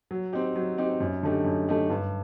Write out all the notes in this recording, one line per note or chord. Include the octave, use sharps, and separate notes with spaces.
F#3
C4 D#4 G4
F#3
C4 D#4 G4
F#2
D3 A3 D#4 G4
F#2
D3 A3 D#4 G4
G2